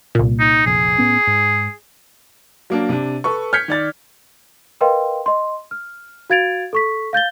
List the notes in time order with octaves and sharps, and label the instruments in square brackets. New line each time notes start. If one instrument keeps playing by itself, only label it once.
[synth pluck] C2 A#2
[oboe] D#4
[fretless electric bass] F1 A#1 [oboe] G#4
[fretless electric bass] A2 B3 C#4
G#2
[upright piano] F#3 A#3 D4
C3 D4
A4 B4 C#6
F6 G6 G#6 B6 C#7
D#3 D5 A6
[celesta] A#4 B4 D#5 F5 G5 C6
D#5 C6
F6
F#4 F5 G#6 A6 D7 F7
A4 C#6 B6
F5 G6 A6 G7